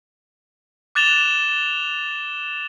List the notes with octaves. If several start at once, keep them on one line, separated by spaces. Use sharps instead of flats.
D6 F#6 A6 E7 F7 G7